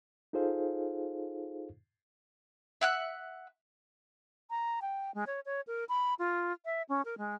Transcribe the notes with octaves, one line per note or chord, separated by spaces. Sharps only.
D#4 F4 G#4 A4 C5 F5
E5 F#5 F#6
A#5
G5
G#3
C#5
C#5
A#4
B5
F4
E5
C#4
A#4
G#3